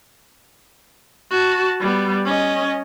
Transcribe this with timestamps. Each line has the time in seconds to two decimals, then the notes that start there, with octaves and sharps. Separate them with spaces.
1.31 F#4 A5
1.80 G3 B3
2.26 C#4 D#5